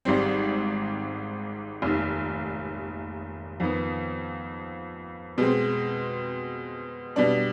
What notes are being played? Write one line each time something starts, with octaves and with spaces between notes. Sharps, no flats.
G#1 G#2 G3 C4
F1 D#2 D#3
F2 D#3 B3
B2 G#3 C4
B2 G3 D4